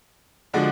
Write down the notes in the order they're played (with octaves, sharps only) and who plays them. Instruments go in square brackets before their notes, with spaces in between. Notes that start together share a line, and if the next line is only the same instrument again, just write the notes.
[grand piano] D3 F3 G#3 D4 F#4